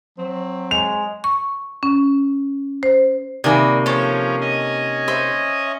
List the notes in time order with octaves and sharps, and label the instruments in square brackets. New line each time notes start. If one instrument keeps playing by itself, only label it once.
[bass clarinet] F#3 [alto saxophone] C4
[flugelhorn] G#3 [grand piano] F7
[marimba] C#6
C#4
C5
[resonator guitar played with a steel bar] C3 D#3 A#3 [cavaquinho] D5 G#5 B5
[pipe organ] F3 C#4 [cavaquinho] A4 C5 C#5
[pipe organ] C#4 D#5 G#5
[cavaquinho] C5 E5